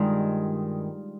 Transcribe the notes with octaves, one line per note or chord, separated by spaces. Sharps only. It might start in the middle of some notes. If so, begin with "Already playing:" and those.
Already playing: G2 D#3 G#3 D#4 F4